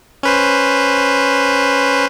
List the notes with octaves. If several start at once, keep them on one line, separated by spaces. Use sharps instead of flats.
C#4 B4 C5